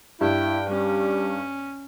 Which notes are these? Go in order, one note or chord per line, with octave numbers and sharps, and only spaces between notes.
G2 E4 G5
G3 C#4